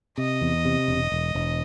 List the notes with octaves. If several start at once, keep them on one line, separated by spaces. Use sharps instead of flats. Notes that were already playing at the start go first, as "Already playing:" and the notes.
C3 D#5
E2
C3
E1
E1
E1